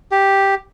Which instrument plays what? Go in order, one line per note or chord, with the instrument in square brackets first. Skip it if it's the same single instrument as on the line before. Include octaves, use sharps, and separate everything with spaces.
[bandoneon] G4